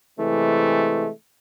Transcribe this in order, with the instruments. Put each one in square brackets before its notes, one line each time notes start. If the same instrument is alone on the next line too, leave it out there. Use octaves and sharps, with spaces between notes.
[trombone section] C3 E3 G#3 A3